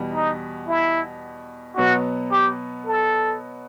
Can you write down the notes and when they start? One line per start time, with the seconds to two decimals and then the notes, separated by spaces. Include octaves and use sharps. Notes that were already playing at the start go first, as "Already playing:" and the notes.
Already playing: E2 B2 G3
0.14 D#4
0.68 E4
1.77 B2 F#3 B3 F#4
2.32 G4
2.86 A4